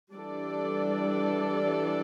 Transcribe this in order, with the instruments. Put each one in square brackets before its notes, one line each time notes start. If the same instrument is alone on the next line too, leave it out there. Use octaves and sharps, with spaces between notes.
[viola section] E3 G3 D4 A4 D5